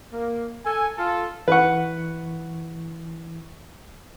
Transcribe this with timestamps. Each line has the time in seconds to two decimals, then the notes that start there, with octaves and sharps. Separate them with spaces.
0.13 A#3
0.65 A4 G#5
0.98 F4 A4
1.48 E3 B4 F#5 C#6